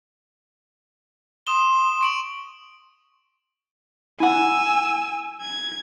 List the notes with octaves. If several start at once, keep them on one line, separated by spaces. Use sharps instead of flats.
C6 D#6 E7 G7
C#6 D7 F#7
E4 F#5 G#5 E6
G#6